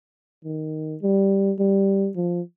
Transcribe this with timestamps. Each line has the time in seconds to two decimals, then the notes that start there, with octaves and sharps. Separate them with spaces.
0.45 D#3
1.02 G3
1.59 G3
2.15 F3